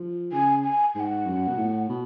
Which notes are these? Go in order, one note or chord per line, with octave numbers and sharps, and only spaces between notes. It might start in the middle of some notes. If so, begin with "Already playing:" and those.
Already playing: F3
C#3 G#5
G#5
G#2 F#5 G#5
F#2
B2
A2
B2